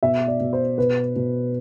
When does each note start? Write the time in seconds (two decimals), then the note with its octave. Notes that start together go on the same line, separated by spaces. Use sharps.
0.03 B2 E5
0.27 D5
0.40 B2
0.53 C5
0.78 B2 B4
1.16 B2